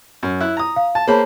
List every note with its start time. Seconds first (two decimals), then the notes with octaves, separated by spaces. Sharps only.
0.23 F#2
0.40 E4 F#6
0.57 A#5 D#6
0.76 F5
0.95 A5
1.08 A#3 G#4 C5 C#5 A5 B5